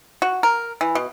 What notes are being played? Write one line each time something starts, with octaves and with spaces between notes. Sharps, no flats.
F#4
A#4
E3
B2